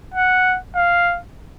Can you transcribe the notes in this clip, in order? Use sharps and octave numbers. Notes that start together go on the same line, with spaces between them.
F#5
F5